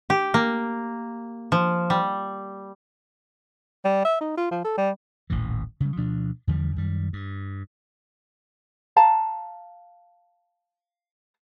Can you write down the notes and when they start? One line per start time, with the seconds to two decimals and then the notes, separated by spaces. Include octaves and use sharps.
0.10 G4
0.34 A#3
1.52 F3
1.90 G3
3.85 G3
4.05 E5
4.21 D#4
4.37 F4
4.51 F3
4.64 A4
4.77 G3
5.30 D#1 A1 A2 E3
5.80 C#3 G3
5.96 D2 B2 F3 D4
6.47 E2 D3 F3 G3
6.76 F#2 D#3 G3
7.13 G2
8.96 F5 A5 A#5